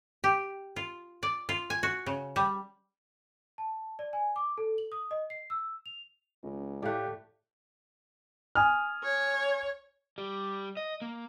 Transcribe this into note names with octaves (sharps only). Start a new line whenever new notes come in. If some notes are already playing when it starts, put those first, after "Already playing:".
G4
F4
D5
F4
G#5
F#4
C#3
G3
A5
D5
G#5
D6
A4
F#7
D#6
D#5
C7
E6
F7
C#2 C#4
A2 A3 G4 D5 F5 F#6
G#5 D#6 F6
C#5
G3
D#5
A#3